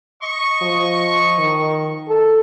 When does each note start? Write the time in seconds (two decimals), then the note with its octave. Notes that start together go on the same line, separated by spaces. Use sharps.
0.23 D#5 C#6
0.62 F3
1.39 D#3
2.09 A4